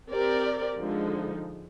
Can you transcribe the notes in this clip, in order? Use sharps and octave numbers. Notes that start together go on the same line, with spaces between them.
C4 G4 A#4 D5
D3 F3 G#3 D#4